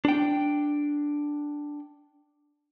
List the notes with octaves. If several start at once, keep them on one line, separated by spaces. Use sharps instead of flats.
D4 G5